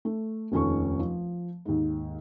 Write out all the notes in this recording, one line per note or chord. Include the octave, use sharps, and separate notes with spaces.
A3
F1 D#2 C#4 F4 A4 C#6
F3
D#2 G#2